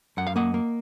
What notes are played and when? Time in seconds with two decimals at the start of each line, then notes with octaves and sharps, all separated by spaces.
0.17 F#2 F#5
0.27 F5
0.36 A#3 D#5 F#5
0.54 A#3